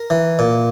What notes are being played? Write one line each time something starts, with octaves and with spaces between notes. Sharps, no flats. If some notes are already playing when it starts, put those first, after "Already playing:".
Already playing: A#4
E3
A#2